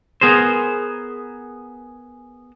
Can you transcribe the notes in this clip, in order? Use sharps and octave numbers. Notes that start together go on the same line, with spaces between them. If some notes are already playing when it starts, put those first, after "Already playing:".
B3 G#4 A#4 C5